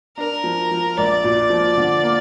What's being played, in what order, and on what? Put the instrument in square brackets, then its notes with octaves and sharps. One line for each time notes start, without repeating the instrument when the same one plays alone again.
[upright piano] D4 [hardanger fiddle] A#4
[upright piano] F3
F3
[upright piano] A#1 [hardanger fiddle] D5
[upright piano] A#2
F3
D3
A#3